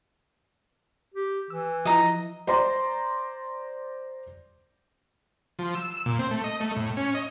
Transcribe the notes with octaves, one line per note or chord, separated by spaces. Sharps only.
G4
E3 E6
F3 E4 D#5 A#5
C5 D5 A#5 C6
F3
E6
A#2
C4
A3
D#5
A3
A2
C#4
D#5